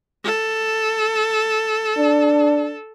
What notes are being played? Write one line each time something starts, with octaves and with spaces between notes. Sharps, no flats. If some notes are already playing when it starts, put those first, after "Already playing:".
A4
D4